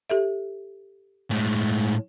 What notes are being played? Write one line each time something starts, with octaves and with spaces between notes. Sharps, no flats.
G4 A4 E5
A2 G#3